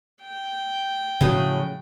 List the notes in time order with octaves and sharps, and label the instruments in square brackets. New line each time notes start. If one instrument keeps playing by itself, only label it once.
[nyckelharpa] G5
[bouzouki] A2 F#3 G#4 [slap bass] C#3 F3 A3